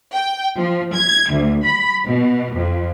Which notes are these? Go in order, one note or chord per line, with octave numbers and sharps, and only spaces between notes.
G5
F3
G#6
D2
B5
B2
F2